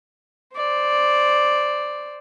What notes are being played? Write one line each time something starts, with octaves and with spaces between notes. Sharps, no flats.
C5 D5